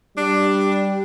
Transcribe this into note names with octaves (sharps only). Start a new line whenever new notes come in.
G3 D4